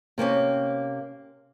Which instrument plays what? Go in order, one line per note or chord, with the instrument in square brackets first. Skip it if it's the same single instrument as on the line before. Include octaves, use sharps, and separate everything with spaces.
[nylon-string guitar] C3 A#3 C4 C#4